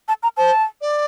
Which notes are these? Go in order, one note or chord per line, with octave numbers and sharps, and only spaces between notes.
A5
A#5
C5 A5
D5